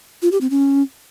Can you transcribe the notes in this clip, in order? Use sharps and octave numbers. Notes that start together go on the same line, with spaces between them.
F4
G4
C4
C#4